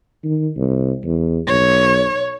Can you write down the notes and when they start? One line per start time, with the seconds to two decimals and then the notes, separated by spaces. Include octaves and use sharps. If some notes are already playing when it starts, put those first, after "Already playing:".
0.24 D#3
0.56 C2
1.04 E2
1.47 B1 C#5